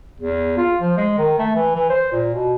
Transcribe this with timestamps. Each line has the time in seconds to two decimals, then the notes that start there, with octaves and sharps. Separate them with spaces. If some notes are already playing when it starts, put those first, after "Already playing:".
0.20 E2
0.57 F4
0.80 F3
0.97 G#3
1.18 D#3
1.39 A3
1.56 E3
1.75 E3
1.90 C5
2.12 A#2
2.35 B2